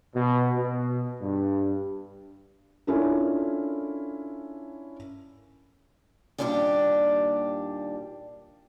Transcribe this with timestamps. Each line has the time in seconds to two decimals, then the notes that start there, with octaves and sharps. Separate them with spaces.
0.15 B2
0.57 B2
1.21 G2
2.87 C#4 D4 E4 F4 A4 A#4
6.38 D#2 A#2 G3 D4 F4 G4